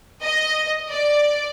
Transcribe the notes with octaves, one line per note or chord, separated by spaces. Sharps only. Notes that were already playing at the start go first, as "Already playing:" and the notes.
D#5
D5